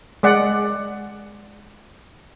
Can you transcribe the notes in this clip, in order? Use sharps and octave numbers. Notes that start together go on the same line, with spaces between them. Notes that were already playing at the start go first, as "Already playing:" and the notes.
G#3 D5 F#5